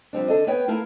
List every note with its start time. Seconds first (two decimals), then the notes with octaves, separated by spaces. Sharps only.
0.13 F3 G3 C4 D4
0.28 D3 D4 A4 D#5
0.47 B3 B4 C#5 G5
0.68 A3 E4 A#4 F5 A5